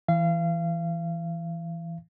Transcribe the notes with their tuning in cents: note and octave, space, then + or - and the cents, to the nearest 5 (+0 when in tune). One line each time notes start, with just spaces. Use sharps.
E3 +5 F5 -30